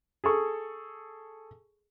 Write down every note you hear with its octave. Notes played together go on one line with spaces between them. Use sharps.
G#4 A4 C#6